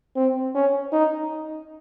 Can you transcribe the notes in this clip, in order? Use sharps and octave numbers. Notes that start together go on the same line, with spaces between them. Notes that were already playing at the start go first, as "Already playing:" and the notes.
C4
C#4
D#4